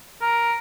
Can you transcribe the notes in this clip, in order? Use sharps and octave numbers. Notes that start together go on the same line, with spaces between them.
A#4